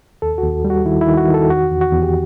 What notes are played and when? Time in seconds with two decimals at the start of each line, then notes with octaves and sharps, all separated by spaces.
0.22 D#2 A4
0.38 F#4
0.44 D#2
0.65 G3
0.70 F#4
0.86 D#3 E4
1.01 E4
1.08 D#3
1.17 F#4
1.29 D#3
1.34 A4
1.50 E2 F#4
1.71 E2
1.81 F#4
1.92 E2
2.03 G4